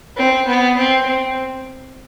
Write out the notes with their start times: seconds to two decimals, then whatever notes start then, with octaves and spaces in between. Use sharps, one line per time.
0.17 C4
0.47 B3
0.77 C4
1.07 C4